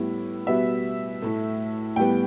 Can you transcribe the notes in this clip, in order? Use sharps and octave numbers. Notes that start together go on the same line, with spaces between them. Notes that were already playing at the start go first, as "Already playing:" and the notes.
Already playing: A2 G3 B3 E4
B2 G3 B3 E5
A2 A3
A2 G3 B3 G5